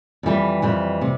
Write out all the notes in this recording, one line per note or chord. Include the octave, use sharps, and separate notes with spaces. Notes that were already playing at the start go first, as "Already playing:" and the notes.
F2 E3 G3
F2 E3 G3
C3 G3